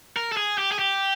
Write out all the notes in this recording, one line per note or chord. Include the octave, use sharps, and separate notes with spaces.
A#4
A4
G#4
G4
G#4
G4